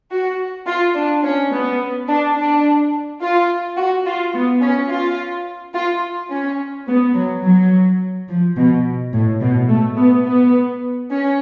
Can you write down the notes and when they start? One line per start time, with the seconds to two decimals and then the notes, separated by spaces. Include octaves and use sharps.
0.11 F#4
0.66 F4
0.95 D4
1.23 C#4
1.52 B3
2.07 D4
2.36 D4
3.21 F4
3.77 F#4
4.05 F4
4.33 B3
4.61 C#4
4.89 F4
5.74 F4
6.30 C#4
6.87 B3
7.15 F#3
7.43 F#3
8.28 F3
8.56 B2
9.13 A2
9.40 B2
9.68 A3
9.97 B3
10.26 B3
11.10 C#4